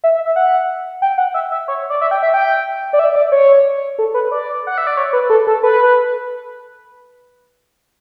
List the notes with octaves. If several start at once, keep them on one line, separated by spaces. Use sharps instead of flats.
E5
E5
E5
F#5
G5
F#5
E5
E5
C#5
D5
E5
G5
E5
G5
D5
E5
D5
C#5
A4
B4
D5
F#5
E5
D5
C#5
B4
A4
A4
B4